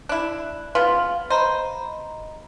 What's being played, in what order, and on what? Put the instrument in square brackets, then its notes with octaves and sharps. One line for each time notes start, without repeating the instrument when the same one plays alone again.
[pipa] D4 E4 [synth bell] F#6
[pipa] C#3 B3 F4 [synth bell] B4
[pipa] C5 [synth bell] D#5 A#5 B5